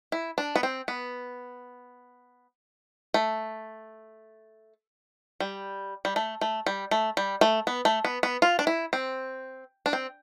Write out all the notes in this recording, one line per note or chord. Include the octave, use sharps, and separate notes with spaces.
E4
D4
B3
C4
B3
A3
G3
G3
A3
A3
G3
A3
G3
A3
B3
A3
B3
B3
F4
D4
E4
C4
D4
C4